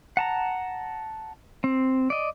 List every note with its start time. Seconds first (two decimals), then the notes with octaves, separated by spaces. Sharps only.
0.17 F#5 A5 A#5
1.64 C4
2.10 D5 D#5